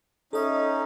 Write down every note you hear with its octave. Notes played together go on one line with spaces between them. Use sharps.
C#4 D#4 A4 D#5 E5